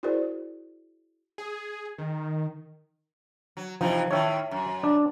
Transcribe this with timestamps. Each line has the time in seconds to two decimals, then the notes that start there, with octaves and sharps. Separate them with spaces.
0.03 E4 F#4 G#4 A#4 C5 D5
1.38 G#4
1.98 D#3
3.57 F#3
3.81 C3 E3 F3 D#4
4.11 A2 D#3 C#5 E5
4.51 F#2
4.83 D4